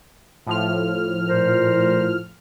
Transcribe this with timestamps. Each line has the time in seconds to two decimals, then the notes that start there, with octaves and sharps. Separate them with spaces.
0.47 A2 F3 F6
1.28 A#2 A#4 C5